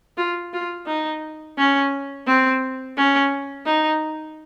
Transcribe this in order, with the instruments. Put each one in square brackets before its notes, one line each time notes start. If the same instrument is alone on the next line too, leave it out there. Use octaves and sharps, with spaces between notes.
[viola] F4
F4
D#4
C#4
C4
C#4
D#4